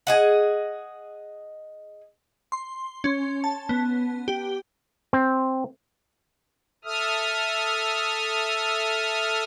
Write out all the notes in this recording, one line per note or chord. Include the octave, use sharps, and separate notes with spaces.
G#4 D#5 F#5
C6
C#4
A5
B3
G4
C4
A4 E5 D#6 F6